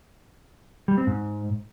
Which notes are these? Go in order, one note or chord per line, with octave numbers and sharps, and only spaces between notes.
G3
C4
G#2